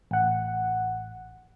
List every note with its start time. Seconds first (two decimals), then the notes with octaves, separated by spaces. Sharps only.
0.11 A1 F#5